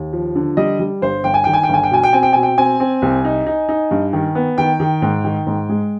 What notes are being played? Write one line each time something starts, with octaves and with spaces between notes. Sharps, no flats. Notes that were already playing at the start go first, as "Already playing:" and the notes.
Already playing: D#2
F3
D3
G3 D#5
G3
G1 C5
G1 G5
G#5
D#3 G5
G#5
G5
G1
G#5
G5
B2 G#5
G5
C4 G#5
G5
B2 G#5
G5
C4 G#5
C4
C2
D#4
D#4
D#4
G2
D#3
B3
D#3 G5
D#3
G#2
D#3
G#2
G#3